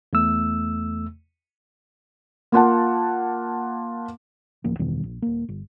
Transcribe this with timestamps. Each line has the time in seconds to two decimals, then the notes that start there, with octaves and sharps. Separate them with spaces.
0.13 E2 A3 E6
2.52 A#3 F4 F#5 A5
4.64 A1 D2 F3 A#3
4.79 E2 G2 B2 D#3
5.03 A#1
5.22 D#1 A#3
5.49 G1